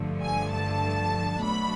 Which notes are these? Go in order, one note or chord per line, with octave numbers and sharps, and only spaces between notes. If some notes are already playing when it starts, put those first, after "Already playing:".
Already playing: G2 D3 F3 A3
G#5
A5
B2 F#3 A3 D4 B5